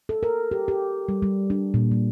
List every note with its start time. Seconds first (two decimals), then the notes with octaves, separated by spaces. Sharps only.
0.09 A4
0.23 A#4
0.51 G4
0.68 G4
1.08 G3
1.22 G3
1.50 D4
1.74 A#2
1.91 G3